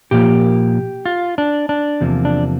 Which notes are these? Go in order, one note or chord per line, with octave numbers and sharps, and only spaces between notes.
A#2 F3 A#3 G4
F4
D4
D4
E2 C3 F3 A#3
D4